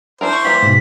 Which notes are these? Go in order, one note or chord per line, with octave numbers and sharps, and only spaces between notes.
D4 E4 A#4 C5
C#6
E3 G3 A#3 B6
G#2 B2